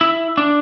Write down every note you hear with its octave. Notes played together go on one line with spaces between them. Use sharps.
E4
D4